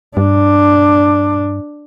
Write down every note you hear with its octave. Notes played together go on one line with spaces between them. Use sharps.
G2 D4